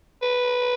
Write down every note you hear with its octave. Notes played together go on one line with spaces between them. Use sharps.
B4